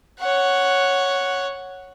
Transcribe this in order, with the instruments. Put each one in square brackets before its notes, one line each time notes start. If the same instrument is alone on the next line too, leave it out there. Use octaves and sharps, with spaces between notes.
[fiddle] C#5 F#5